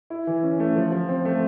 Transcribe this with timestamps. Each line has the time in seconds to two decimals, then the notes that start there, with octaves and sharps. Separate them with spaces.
0.10 E4
0.27 E3
0.43 C#4
0.60 A3
0.76 F3
0.92 F3
1.09 C4
1.25 A3